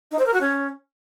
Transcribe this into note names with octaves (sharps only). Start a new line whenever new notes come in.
D#4
C5
A#4
F#4
C#4